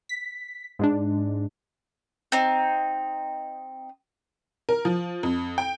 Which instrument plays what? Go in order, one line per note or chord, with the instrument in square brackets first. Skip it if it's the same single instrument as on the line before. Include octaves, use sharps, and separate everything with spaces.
[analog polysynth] B6
G#2 G#3 D4
[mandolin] C4 D#4
[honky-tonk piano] A#4
F3
F2
G5